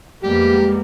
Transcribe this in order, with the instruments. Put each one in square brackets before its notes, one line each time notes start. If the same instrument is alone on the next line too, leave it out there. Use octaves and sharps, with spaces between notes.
[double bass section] F2 G#3 B3 [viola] G3 A#3 [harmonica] G4